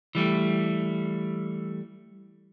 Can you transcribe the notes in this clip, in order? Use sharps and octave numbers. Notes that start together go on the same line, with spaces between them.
E3 G3 A3